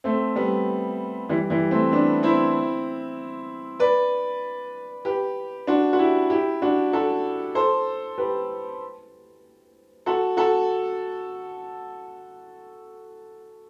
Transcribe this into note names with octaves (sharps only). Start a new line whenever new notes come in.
A3 C4
G3 B3
E3 G3
E3 G3
A3 C4
B3 D4
C4 E4
B4 D5
G4 B4
D4 F#4
F#4
E4 G4
E4 G4
D4 F#4
F#4 A4
A4 C5
G4 B4
F#4 A4
F#4 A4